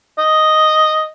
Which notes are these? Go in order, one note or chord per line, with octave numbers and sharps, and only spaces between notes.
D#5